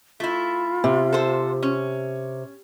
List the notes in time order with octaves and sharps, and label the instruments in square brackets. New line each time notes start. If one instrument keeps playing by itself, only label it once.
[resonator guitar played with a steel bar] A3 E4 [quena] F4
[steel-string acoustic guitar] C3
[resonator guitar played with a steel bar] A4 C5
C#4